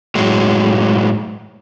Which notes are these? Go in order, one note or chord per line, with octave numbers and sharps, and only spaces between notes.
A2 F#3 G#3